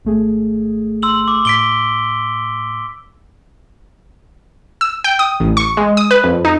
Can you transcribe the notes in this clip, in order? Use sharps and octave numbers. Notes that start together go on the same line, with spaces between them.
G#1 A3 G#4
C6 E6 F#7
D6
A2 B6 D7 G7
E6
G5
D#6
A1
C#6
G#3
D#6
B4
F2
D#4